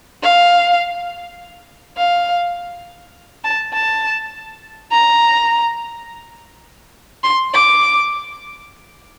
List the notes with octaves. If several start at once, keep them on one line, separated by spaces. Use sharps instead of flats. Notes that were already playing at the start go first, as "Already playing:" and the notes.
F5
F5
A5
A5
A#5
C6
D6